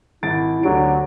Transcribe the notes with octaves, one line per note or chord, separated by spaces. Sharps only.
G#1 E4 A6 D7
D2 D3 F#3 G4 D7